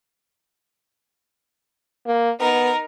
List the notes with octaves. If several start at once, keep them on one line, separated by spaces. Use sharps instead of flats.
A#3
B3 D#4 A#4